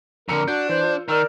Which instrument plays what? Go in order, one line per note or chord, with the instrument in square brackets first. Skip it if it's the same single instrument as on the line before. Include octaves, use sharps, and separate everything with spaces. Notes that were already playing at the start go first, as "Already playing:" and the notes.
[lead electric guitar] F2 D3 [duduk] A#4 [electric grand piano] A#5 E6 C#7
[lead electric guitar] D4 [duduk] F#4 [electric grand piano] G6
[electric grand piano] E3 [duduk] C5
[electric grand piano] F4
[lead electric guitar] D#3 [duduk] A#4 [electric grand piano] D5 E6 F6